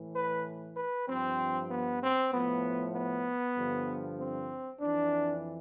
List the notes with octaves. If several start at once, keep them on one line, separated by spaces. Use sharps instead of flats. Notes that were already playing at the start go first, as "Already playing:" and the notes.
Already playing: A2 E3
B4
B4
G2 F3 C4
B3
C4
A2 F3 B3
B3
G2 D3 F3
C4
F2 E3 D4